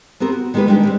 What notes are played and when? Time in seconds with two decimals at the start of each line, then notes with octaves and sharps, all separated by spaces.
0.20 B3 C4 G4 A#4
0.32 F#4
0.54 D#3 G#3 A#3 C#4 G4 B4
0.68 G3 G#3 A#3 D4 F#4 G4
0.83 G3 G#3 C4